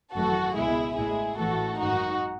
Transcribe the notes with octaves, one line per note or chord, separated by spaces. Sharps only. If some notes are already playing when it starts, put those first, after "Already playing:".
G#1 F#2 E3 A3 F#4 A4
C#2 B2 G#3 E4 G#4
A1 A2 G#3 E4 G#4
A1 A2 E3 A3 F#4 A4
G#1 F#2 D#3 D#4 F#4